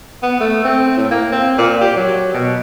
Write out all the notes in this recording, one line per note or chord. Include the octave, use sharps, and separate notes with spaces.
B3
A3
C4
A2
A#3
C4
A#2
G4
F#3
B2